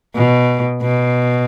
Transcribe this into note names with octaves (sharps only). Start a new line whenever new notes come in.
B2
B2